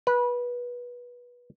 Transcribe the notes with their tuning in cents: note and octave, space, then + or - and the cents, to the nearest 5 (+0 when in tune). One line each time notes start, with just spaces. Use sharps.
B4 -20